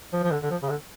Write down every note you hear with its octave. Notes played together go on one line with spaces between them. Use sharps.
F3
F3
D3
D3
F3
C#3
D3